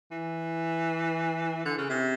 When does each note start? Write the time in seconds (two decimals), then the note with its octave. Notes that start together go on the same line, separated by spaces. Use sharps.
0.11 E3
1.65 D3
1.78 C#3
1.89 C3